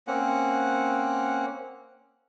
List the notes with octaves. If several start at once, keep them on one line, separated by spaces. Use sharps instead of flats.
A#3 C4 C#4 F#5